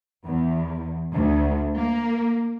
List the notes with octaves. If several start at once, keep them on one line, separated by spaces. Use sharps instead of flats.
E2
D2
A#3